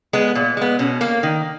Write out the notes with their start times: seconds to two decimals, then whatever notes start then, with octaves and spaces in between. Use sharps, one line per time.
0.13 G#3 B3
0.35 A#2
0.57 G#3 B3
0.79 B2 C#4
1.01 A#3
1.23 D#3